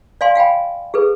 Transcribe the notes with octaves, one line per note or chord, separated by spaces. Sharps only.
D5 F5 G#5 C6
F5 G5 G#5 B5
G#4 A4 B4